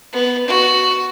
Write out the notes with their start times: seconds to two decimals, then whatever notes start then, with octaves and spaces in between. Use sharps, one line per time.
0.13 B3
0.47 F#4